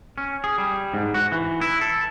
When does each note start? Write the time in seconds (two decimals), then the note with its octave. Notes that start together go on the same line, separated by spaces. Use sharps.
0.18 C#4
0.44 G#4
0.58 G3
0.94 G#2
1.14 F#4
1.32 E3
1.61 E4
1.81 A4